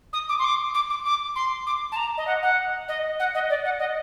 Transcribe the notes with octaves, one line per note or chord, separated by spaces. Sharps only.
D#6
D6
C6
D6
D6
D6
D6
C6
D6
A5
A#5
D#5
F#5
F#5
D#5
F#5
D#5
D5
F#5
D#5